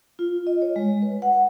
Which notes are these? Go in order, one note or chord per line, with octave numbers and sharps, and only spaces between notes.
F4
D#5
C#5
G#3
B4
F#5